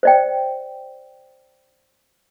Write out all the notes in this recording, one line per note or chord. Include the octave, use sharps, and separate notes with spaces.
C5 D5 G5